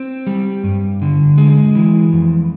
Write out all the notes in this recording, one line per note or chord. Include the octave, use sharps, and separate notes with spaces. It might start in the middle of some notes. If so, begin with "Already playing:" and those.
Already playing: C4
G3
G2
D3
G#3
E3
F2